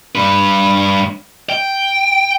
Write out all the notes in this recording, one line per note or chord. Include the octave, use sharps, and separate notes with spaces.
G2 B4
G5